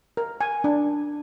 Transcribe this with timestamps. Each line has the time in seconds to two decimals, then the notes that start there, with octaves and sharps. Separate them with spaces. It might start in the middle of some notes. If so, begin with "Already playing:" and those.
0.17 A#4
0.41 G#5
0.64 D4